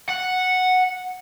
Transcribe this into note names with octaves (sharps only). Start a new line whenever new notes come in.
F#5